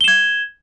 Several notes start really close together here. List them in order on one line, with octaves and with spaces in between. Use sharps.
G7 E7 G#6